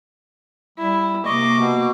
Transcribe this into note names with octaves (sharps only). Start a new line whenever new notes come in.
G3 E4
C3 A#3 D#5 C#6 D6
B2